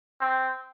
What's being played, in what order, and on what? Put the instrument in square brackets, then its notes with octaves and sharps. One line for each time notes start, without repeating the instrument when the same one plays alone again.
[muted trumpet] C4